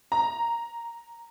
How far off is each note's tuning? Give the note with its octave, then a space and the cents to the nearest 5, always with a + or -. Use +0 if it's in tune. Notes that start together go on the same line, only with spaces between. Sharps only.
A#5 +0